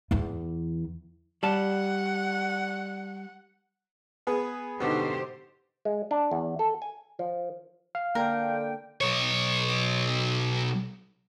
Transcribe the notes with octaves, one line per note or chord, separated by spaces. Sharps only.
E2 E3
G3 F#5 A5
B3 G#4 B4
B2 D3 D#4 F#4 G4 C5
G#3
D4
E2
A4
G#5
F3
F5
D3 A#3 A#4 G5
B1 C#5